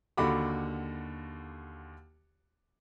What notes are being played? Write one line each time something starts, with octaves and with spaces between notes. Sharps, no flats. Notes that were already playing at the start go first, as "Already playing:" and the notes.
D#2 D3 F#4 F#5 B5 D6